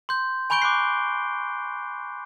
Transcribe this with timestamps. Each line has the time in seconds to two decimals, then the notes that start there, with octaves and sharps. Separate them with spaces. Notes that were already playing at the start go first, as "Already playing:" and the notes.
0.09 C6 G6
0.50 G#5 B5 C#6 G6 D7 G7
0.62 D6 F#6 C7